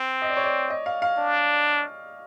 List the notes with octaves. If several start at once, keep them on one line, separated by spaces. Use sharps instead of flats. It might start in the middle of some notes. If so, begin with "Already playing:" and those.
Already playing: C4
D#5
D5
C#5
D5
D#5
F5
F5
D4